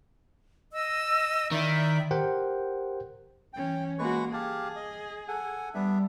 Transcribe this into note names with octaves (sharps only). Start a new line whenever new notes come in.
D#5 E6
D#3 E4 D5 E5
G4 A#4 C5 F#5 G5
E3 C#4 G5
G#3 A#3 F#4 B4 C#6
G4 G#4 F5 A5
D#5
A4 F#5 G#5
G3 B3 D4 E5